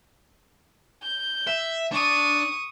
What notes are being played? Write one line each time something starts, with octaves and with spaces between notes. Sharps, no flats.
G6
E5
D4 C#6 D#6